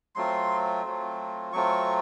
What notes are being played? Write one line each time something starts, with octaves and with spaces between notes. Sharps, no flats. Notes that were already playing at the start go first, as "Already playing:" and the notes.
F#3 A3 C4 F4 C6
F#3 A3 C4 F4
F#3 A3 C4 F4 C#6